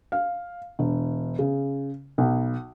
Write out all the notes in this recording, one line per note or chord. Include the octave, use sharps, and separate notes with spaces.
F5
E1
C#3
B1